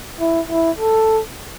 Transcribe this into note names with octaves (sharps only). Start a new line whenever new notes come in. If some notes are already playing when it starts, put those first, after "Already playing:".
E4
E4
A4